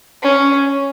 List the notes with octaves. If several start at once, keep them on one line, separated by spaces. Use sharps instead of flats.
C#4